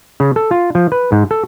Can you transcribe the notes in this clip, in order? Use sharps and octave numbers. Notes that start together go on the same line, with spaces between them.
C#3
A4
F4
F3
B4
G#2
A4